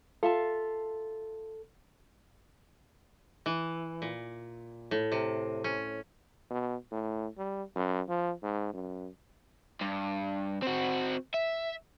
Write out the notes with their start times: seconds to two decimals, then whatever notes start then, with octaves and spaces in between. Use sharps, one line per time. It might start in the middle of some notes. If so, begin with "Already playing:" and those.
0.23 F4 A4 E5 A5
3.46 E3
4.02 A#2
4.91 A2
5.12 C3
5.64 C#4
6.51 B2
6.92 A2
7.38 G3
7.76 F#2
8.09 F3
8.43 G#2
8.74 F#2
9.81 G2
10.62 C4 F#4
11.34 E5